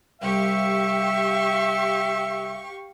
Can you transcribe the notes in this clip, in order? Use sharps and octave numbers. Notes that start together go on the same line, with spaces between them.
C2 C3 G4 E5 F5 C#6